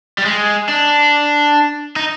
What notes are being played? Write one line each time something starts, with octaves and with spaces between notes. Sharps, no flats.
G3
G#3
D4
D#4